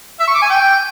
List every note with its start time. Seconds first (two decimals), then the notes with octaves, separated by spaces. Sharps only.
0.20 E5
0.27 C#6
0.35 D6
0.42 G#5
0.50 G5